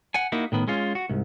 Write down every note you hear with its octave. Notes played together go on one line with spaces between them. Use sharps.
F#5 G#5
A#3 D#4 E4 F#4
A2 D#3 B3
G#3 C#4 F4
F#4
C2 G#2